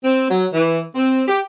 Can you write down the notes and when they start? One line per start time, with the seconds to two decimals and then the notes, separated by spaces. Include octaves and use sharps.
0.04 C4
0.30 F#3
0.53 E3
0.95 C4
1.28 G4